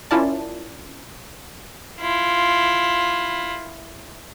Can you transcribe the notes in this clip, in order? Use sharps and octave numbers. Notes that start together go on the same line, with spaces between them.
C#4 E4 F4 A#4 D5 A5
E4 F4